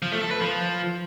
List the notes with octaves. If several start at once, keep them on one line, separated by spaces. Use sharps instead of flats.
F3
A3
A4
B4
F3